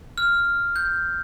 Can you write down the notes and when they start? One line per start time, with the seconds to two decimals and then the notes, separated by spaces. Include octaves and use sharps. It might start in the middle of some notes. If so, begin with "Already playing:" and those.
0.18 F6
0.76 G6